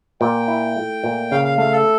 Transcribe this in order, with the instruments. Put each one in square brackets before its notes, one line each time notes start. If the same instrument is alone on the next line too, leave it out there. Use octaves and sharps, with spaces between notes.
[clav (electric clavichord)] A#2 [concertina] G5
[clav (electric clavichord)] E4
A3
A#2
[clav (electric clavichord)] C#3 [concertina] F5
[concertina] F5
[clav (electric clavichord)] A3 [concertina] F5
[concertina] A4